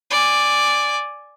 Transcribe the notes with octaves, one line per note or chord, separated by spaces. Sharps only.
D5 G#5